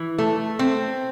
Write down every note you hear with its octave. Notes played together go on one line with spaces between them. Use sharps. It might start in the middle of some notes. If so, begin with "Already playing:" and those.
Already playing: E3
A3
C4